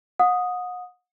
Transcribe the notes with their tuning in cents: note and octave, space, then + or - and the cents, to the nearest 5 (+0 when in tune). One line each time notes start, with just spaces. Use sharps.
F#5 -35 D#6 +0